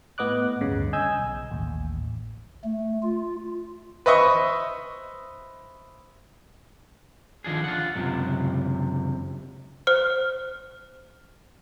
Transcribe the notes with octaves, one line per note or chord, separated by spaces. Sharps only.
A2 B3 D#5 D6 F#6
D2 G2 C#3
D#5 G#5 E6 G6 G#6
B1
A1 D#2
A3
F4
B4 C5 D#5 E5 C#6
D3 D#3 F3 D4 G#4
F4 F#5
C#2 F#2 C3
C5 F6